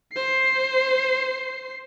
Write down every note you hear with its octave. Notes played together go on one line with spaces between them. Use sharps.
C5 C7